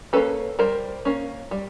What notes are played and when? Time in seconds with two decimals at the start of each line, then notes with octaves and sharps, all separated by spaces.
0.13 A#3 C#4 A4 B4
0.59 G3 A#4 C5
1.05 A#3 C#4
1.51 G3